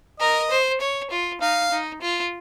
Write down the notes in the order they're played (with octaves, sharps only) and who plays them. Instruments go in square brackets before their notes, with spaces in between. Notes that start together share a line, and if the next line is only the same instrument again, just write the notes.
[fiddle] A#4 [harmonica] D#5
[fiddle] C5
C#5
F4
[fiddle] D#4 [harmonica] F5
[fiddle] D#4
F4